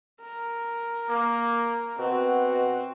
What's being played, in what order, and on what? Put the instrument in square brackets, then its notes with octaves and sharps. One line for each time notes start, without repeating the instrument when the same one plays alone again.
[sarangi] A#4
[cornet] A#3
[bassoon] B2 [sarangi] C4 [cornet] F#4